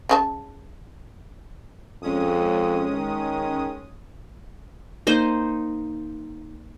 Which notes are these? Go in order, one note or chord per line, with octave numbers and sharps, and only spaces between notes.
C#3 C#4 A5
F2 G#3 C#4 D#6
D#3
A#3 D#4 C5